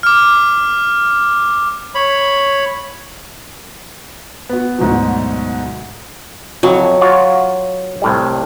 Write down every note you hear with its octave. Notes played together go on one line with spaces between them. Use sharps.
D6 F6
C#5 B5
B3 F#4
D2 G#2 B2 F#3
F2 F#3
F4 F#4 C#5
C2 A2 G3